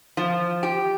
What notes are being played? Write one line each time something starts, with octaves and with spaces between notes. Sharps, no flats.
F3
G4